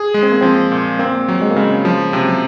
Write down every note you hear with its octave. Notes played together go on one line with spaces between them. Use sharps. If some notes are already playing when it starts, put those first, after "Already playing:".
Already playing: G#4
G#3
C4
A#3
F3 C4
A#2
A#3 C4
F#3
G#3
A#3
C#3 G#3
F3 F#3
C3
F#3